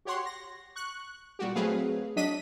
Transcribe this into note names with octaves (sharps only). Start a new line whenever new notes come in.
F#4 G4 C#5 F#5 C6
A#6
C#6 F#6
A#2 G3 F#4 G4
F#3 A3 C4 G#4 B4 F5
F#3 D4 D#5 B6 D#7